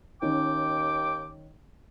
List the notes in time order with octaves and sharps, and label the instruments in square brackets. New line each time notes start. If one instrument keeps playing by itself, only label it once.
[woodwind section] D#2 G5 D6 [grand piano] D#3 C#4